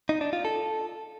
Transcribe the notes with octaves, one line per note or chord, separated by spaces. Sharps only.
D#4
D4
F4
A4